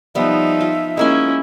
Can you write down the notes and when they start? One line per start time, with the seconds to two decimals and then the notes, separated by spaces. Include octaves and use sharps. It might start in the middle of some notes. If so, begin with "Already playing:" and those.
0.15 F3 G3 B3 D#4 E5
0.61 F4
0.97 G#3 A#3 C#4 E4 G#5